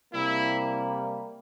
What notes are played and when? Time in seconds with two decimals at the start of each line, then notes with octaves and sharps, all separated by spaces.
0.13 C3 G3 A#3 E4